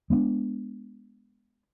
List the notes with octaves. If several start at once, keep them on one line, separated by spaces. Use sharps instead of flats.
G#3 B3 C4 D4